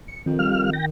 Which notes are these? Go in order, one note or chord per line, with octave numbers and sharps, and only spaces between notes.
C#7
F2 D#3
G3 F5 F6
G5 A#6